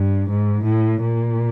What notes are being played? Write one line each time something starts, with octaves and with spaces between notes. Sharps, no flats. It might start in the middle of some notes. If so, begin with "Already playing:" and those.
Already playing: G2
G#2
A2
A#2